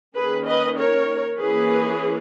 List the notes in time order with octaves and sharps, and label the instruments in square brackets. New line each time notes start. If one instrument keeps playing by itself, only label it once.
[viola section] D#3 A#3 C#4 G#4 B4
B4 D#5
A#4 C#5
E3 A#3 C#4 G#4 B4